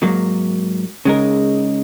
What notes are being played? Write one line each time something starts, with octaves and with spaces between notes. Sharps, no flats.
G#2 F#3 A#3
C#3 G#3 D#4 A#4